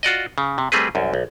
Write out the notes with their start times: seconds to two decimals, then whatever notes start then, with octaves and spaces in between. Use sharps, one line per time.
0.03 F4 F#4 D5 D#5
0.38 C#3
0.58 C3
0.72 G3 A3 C4 G#4 B4
0.95 C2 F#2
1.14 B1